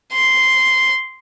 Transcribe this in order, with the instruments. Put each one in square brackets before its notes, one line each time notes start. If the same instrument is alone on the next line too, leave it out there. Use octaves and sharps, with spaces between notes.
[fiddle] C6